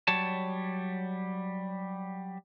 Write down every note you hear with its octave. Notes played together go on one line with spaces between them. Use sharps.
F#3 G3 C#5 A5